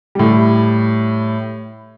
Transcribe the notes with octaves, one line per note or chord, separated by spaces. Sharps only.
A2 G3